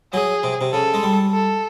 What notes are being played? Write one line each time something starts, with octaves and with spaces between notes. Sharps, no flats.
F#3 G#4
C3
C3
C#3 A4
G#3
G3
A4